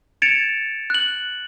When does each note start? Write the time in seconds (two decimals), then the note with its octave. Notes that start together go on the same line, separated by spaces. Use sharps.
0.22 G#6 A6 C#7 D7 E7 F7
0.90 F#6 F#7